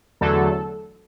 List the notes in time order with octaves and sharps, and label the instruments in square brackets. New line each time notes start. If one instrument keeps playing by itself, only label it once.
[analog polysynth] E2 D3 F#3 A3 A4